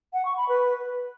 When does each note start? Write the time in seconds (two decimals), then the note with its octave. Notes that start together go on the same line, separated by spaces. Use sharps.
0.13 F#5
0.25 C#6
0.37 B5
0.49 B4